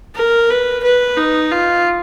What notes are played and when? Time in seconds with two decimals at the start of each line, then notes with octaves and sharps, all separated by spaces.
0.15 A#4
0.50 B4
0.83 B4
1.17 D#4
1.51 F4